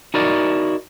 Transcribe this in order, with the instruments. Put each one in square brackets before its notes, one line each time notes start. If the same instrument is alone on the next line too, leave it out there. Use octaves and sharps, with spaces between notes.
[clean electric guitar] D#4 E4 F#4 A#4 D5